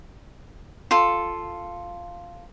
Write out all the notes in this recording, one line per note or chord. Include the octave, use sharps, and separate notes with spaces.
F4 A4